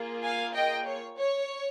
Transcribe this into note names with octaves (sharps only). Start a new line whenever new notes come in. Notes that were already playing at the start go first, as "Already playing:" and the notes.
Already playing: A#3 F4 G#4
F5 G#5
D#5 G5
C#5
C#5